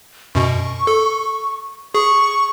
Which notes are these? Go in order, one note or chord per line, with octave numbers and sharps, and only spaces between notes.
F#2 B2 C#6
A4
G#4 C#6